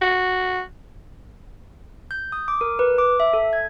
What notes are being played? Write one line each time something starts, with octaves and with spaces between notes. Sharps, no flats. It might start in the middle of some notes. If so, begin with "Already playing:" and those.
F#4
G6
D#6
D6
A#4
B4
D6
E5
A4
G#6